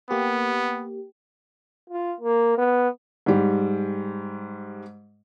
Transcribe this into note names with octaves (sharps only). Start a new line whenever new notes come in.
A#3 B3 G4
F4
A#3
B3
G#2 G3